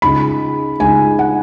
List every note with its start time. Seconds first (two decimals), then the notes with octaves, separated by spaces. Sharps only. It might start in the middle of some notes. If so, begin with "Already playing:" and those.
0.02 C#2 C#3 G#3 D#4 B5
0.80 C#2 C#3 G#3 D#4 G#5
1.19 F#5